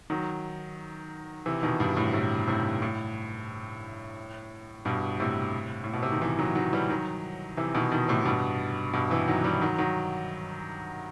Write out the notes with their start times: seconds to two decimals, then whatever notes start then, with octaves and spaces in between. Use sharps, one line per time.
0.10 D#3 F#3
1.46 C3 E3
1.63 B2 D#3
1.80 G2 B2
1.97 A2
2.13 A2 C3
2.47 A2 C3
2.82 A2
4.85 G2 B2
5.20 A2 C3
5.84 A2
5.93 B2
6.03 C3
6.12 D#3
6.22 C3 E3
6.39 D#3 F#3
6.55 D#3 F#3
6.73 E3 G3
6.89 D#3 F#3
7.57 C3 E3
7.74 B2 D#3
7.92 B2 D#3
8.08 A2 C3
8.25 G2 B2
8.93 G2 B2
9.10 C3 E3
9.27 D#3 F#3
9.44 E3 G3
9.61 D#3 F#3
9.78 D#3 F#3